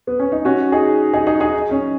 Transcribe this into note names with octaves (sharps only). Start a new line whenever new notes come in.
B3
C#4
D#4
C#4 F#4
D#4 G#4
D#4 G#4
D#4 G#4
D#4 G#4
C#4